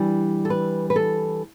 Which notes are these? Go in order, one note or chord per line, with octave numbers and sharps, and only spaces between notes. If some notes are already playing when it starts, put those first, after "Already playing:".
Already playing: E3 G3 D4
A4
B4
B4
A4